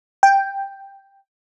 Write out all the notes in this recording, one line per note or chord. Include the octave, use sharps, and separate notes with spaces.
G5